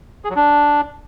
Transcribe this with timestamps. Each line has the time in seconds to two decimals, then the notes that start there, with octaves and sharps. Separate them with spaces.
0.24 G#4
0.30 F#3
0.36 D4